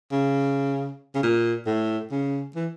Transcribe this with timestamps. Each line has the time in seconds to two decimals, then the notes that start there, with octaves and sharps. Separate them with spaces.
0.12 C#3
1.15 C#3
1.23 A#2
1.66 A2
2.11 C#3
2.56 E3